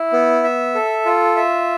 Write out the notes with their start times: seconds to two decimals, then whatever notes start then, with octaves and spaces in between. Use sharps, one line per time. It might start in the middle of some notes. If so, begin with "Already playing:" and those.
Already playing: E4
0.13 B3
0.44 E5
0.75 A4
1.06 F4
1.36 E5